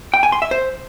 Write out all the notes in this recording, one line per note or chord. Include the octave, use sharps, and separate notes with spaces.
G5
G#5
C6
E5
C5